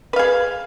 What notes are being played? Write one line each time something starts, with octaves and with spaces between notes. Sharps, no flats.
G#4 B4 F5